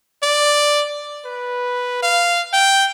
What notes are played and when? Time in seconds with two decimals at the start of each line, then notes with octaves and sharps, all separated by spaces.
0.23 D5
1.25 B4
2.02 F5
2.53 G5